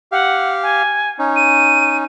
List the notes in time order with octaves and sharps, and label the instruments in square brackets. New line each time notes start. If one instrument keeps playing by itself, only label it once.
[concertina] G4 F5 [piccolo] F#5
[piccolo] G#5
[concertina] C#4 D#4
[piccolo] D#7